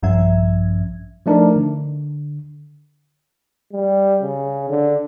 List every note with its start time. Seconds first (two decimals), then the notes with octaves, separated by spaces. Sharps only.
0.02 A#1 G2 F3 C#4 E5 G#6
1.26 F3 A3 D4 D#4 A#4
1.56 D3
3.72 G3
4.22 C#3
4.70 D3